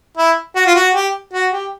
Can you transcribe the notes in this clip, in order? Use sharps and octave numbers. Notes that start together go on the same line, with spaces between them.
E4
F#4
F4
F#4
G4
F#4
G4